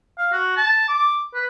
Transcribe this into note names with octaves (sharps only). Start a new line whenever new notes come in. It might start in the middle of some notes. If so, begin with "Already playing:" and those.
F5
F#4
A5
D6
B4